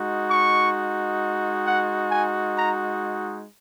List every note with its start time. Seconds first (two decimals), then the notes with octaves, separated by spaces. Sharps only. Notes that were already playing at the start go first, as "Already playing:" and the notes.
Already playing: G#3 D#4 F#4
0.29 C#6
1.65 F#5
2.10 G#5
2.56 A#5